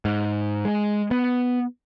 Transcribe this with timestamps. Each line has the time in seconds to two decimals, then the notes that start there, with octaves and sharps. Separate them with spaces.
0.05 G#2
0.65 G#3
1.11 B3